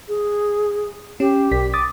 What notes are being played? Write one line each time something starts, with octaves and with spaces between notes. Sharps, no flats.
G#4
C#4 G4
B1 B6
D6 D#6 A6